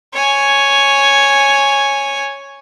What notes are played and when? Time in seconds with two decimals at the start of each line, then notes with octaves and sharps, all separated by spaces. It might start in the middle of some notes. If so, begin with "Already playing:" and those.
0.14 C#5 G#5